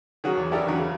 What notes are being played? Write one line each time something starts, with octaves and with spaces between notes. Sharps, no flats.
D#3 F#3 C#4 F#4 G#4
E2
C#4 E4 G4 A4 A#4 D5
E2 D3 F#3 C#4 D#4
C#3